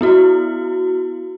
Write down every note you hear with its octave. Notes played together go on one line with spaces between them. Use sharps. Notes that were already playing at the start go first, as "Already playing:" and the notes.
B3 E4 F#4